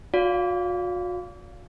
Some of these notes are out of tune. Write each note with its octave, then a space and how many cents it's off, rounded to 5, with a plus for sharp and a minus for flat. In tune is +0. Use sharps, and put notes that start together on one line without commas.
F#4 -45 D5 -35 F5 +0